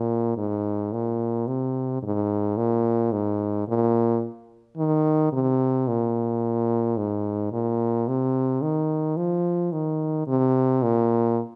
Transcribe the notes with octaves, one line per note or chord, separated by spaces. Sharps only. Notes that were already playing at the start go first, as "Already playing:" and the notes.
Already playing: A#2
G#2
A#2
C3
G#2
A#2
G#2
A#2
D#3
C3
A#2
G#2
A#2
C3
D#3
F3
D#3
C3
A#2